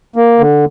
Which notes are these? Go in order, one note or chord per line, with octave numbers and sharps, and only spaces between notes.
A#3
D3